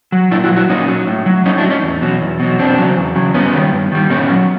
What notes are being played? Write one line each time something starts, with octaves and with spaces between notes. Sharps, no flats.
F#3
A#2 D4 E4
E4 F#4
F#3
E4 F#4
A#2 C#4 D#4
F#3
A2
F#3
A2 C#4 D#4
D4 E4
F#3
C#4 D#4
E2
B2 F#3
E2
B2 F#3
E2 C4 D4
C#3 F#3
E2
C#3 F#3
G2 B3 C#4
D#3 G3
G2
D#3 G3
A#2 B3 C#4
F#3